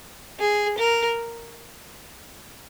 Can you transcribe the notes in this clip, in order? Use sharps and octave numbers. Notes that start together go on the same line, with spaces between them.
G#4
A#4